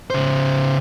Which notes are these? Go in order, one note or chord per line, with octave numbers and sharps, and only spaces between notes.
C#3 C5